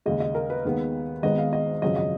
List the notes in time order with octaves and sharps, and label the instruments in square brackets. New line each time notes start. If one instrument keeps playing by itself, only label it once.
[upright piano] D#2 C#3 G#3 D#5
D#5
A#4
B4
D#2 D#3 G#3 B3
G#1 G#2 D#3 G#3 B3 D#5
F5
D#5
G#1 F#2 C#3 F3 D#5
D#5